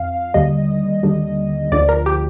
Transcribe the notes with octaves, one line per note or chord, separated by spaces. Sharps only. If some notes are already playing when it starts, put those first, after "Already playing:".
Already playing: F2 F5
D#2 D3 G3 D#5
D#2 D3 G3
D2 D3 F3 D5
A#4
G4